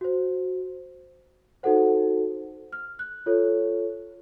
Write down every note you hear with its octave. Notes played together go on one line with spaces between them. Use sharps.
F#4 C5
D#4 F#4 A4 C5 F#5
F6
F#6
F4 A4 C#5